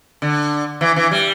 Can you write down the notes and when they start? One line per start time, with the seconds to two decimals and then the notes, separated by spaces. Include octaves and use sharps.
0.22 D3
0.81 E3
0.96 E3
1.11 G3